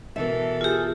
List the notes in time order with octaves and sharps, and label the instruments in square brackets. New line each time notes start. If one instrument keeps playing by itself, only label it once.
[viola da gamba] B2 E3 A4 [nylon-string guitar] A#4 E5
[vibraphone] F4 G4 [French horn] G#4